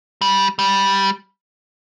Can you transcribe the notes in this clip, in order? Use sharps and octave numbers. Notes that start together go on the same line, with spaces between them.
G3
G3